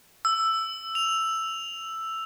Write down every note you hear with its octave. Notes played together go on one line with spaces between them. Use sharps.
E6
F7